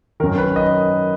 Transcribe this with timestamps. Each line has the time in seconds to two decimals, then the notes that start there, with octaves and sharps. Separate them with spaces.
0.20 D#3 A#4
0.23 F#2
0.38 B4
0.56 D#5